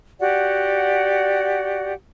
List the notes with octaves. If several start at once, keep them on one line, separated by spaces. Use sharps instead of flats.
F#4 G4 D5 F#5